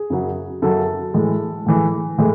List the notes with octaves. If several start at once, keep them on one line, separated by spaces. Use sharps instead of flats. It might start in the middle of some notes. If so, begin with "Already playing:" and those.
Already playing: G#4
F#2 C#3 F#3
F#2 C#3 F#3 A4
A2 E3 G#3
A2 E3 G#3
A2 E3 G#3